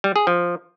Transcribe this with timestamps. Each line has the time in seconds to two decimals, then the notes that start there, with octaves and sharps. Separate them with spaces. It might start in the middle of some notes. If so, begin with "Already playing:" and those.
0.04 G3
0.16 G#4
0.27 F3